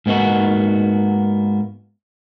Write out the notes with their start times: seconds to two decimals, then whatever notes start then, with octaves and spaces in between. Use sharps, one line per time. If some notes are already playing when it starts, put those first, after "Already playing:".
0.06 G#2 A#3 B3 D#4 F#4